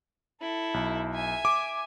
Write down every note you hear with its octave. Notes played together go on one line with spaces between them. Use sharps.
E4 A4
B1
E5 G#5
D6